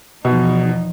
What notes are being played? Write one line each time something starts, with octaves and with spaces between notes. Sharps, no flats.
E2 B2 F3 D#4